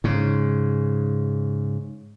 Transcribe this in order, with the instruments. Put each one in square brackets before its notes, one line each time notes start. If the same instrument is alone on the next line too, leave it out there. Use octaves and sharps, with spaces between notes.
[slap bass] G#2 C#3